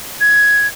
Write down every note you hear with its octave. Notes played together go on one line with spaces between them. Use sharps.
G#6